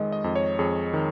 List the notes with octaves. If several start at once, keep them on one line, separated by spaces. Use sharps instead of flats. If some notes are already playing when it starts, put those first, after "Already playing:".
Already playing: F2 D#3 G#3 D#5
D#5
F2
C#5
F2 G#4
D#3